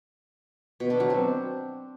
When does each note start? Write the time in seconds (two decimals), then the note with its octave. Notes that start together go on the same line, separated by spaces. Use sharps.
0.80 B2
0.90 D4
1.00 F#3
1.10 C4